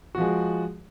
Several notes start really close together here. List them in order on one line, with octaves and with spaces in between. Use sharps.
F#4 F3 G#3